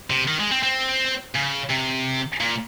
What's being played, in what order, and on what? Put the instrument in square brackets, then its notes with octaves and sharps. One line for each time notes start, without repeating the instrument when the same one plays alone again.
[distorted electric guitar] C3
D#3
G#3
C4
C4
C#3
C3
A#2